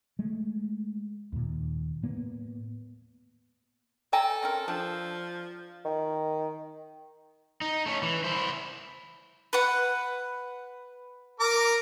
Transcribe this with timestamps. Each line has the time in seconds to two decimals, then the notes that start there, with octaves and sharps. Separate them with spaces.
0.19 G#3 A3
1.32 D#2 A#2
2.03 A2 A#3 B3
4.13 A4 G5 G#5 A#5
4.42 C4 C#4 A#4
4.68 F3 D4
5.85 D#3
7.61 D#4
7.86 A3 C#4
8.03 E3
8.24 E4 C5
9.53 B4 F#5
11.40 A#4 A#5 D6